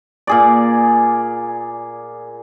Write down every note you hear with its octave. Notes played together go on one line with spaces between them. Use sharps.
A#2 G#4 D5